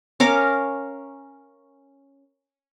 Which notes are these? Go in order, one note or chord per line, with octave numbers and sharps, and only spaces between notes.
C#4 A#4 F5 D6